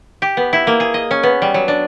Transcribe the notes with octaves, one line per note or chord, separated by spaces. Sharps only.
G4
B3
E4
A#3
G#4
D#5
C#4
B3
G3
F#3
D4